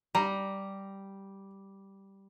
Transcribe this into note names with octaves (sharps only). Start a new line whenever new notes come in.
G3 A#5